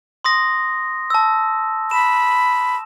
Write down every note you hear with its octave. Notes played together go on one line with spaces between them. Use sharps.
C6 D#6 A#6
A5 E6
B5 E7